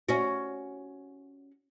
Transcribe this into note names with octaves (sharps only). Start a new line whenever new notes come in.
C#4 F#4